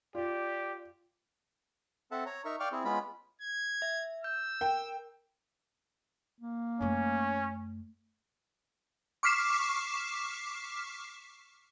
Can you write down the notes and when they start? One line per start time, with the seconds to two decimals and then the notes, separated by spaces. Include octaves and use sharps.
0.15 F4 G4 D5
2.11 C4 A4 E5 F#5 A5
2.26 C#5 A#5
2.45 D#4 A#4 E5 C#6
2.60 D5 F5 G5 C#6 D6 F6
2.72 C4 E4 G#4
2.85 G#3 B3 C#4 F4 B5
3.42 G#6
3.82 E5
4.24 E6 G6
4.61 A#4 G5
6.41 A#3
6.81 F#2 A3 C#4
9.23 C#6 D6 F6 B6 C7 E7